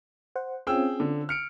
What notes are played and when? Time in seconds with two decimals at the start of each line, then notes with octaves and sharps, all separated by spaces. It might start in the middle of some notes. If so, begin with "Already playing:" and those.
0.36 C5 F#5
0.67 C4 C#4 F4 G#4 G5 E6
1.00 D3
1.29 F6 C#7 D7